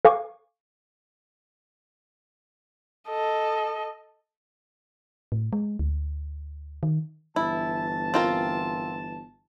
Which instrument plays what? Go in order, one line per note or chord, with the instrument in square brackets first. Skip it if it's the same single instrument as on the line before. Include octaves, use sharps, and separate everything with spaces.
[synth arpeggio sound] A4 F5 G#5 C#6 D6
[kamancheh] A4 D#5
[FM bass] A2
G#3
D2
D#3
[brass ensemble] G1 E3 A5 [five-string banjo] E4
[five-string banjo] C4 F4 A#4